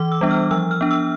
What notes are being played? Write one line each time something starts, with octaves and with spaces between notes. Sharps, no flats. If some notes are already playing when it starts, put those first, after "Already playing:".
Already playing: E3 D6
E6
G3 B3 D4
F6
F3 E6
F6
B3 D4
E6